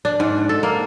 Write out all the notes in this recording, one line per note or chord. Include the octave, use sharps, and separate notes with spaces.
D4
G#2
A4
A#3